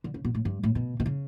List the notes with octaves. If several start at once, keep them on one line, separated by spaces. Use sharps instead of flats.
D3
C#3
B2
A2
G2
A2
B2
B2
C#3